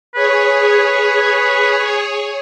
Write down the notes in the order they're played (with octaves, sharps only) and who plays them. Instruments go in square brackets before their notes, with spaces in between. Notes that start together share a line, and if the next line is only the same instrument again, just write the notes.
[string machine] G#4 C#5 [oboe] B4